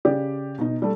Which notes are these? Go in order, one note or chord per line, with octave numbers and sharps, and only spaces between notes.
C#3 G4 D5
B2 D#4
G3 A3